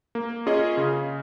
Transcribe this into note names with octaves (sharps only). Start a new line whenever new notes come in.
A#3
C#4 F4 G#4 D#5
C#3